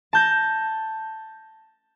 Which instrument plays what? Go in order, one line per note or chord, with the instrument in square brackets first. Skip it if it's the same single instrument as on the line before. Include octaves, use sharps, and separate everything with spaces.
[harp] A5 G6 A#6